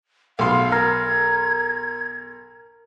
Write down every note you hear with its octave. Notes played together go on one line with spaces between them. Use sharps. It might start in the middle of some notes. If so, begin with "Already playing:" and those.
B1 F5 C6
A#4 G#6